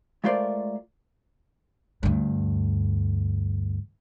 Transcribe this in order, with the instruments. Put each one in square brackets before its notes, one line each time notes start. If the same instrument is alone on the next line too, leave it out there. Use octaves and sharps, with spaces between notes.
[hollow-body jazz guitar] G#3 A3 F4 A#4 C5 D5
[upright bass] D2 G2